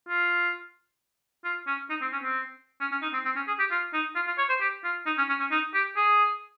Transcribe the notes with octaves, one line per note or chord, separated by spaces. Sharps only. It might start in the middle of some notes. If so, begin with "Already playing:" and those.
F4
F4
C#4
D#4
C4
C#4
C4
C#4
C#4
D#4
C4
C4
C#4
G#4
G4
F4
D#4
F4
F4
C#5
C5
G4
F4
D#4
C#4
C#4
C#4
D#4
G4
G#4